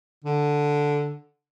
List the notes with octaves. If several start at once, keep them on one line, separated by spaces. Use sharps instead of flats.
D3